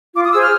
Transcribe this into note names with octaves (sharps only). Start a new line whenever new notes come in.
F4 D6
D#6
G#4 C5 E6
F6